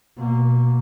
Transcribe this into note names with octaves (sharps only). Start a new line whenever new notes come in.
B2 A#3